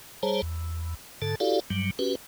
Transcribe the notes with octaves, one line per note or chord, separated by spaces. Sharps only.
G3 G#4 C5 C#5 A5 A#5
E2
G#2 D3 A4 A5
E4 F#4 G4 A4 D5 F5
G2 F#3 G3
C#4 F#4 G4 B4